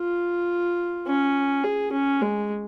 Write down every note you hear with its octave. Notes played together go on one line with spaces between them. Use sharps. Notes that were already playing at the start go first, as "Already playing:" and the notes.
Already playing: F4
C#4
G#4
C#4
G#3